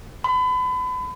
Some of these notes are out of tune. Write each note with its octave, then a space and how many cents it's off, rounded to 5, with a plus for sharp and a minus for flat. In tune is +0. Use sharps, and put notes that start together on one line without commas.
B5 +35